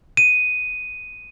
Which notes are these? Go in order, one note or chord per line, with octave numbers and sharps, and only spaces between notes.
D#7